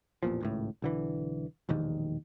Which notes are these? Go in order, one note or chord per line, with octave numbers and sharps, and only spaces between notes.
A1 E2 A#2 F3
G#1 C#2 A2
B1 D3 E3
E1 A#1 D#2 D#3